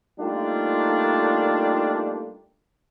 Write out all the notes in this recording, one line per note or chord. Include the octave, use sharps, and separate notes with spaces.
G3 A3 A#3 D4 D#4 F4